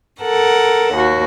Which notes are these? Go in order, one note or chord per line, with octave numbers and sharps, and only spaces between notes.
A4 A#4 F#5
D#2 F#4